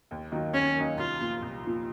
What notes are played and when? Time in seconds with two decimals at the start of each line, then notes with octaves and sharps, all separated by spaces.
0.11 D#2
0.32 D#3 F#3 A#3 D#4
0.53 D#2 C#4
0.76 D#3 F#3 A#3 D#4
0.97 C2 F4
1.19 A#2 F3
1.42 C2
1.63 A#2 F3